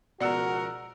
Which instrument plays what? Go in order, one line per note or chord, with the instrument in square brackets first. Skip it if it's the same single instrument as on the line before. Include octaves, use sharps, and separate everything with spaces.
[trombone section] C#2 F3 F#4 [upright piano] B2 F#5 E6 [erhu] A#4 [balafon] D5